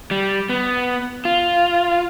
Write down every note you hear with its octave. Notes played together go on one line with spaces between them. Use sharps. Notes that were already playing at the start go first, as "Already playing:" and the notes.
G3
B3
F4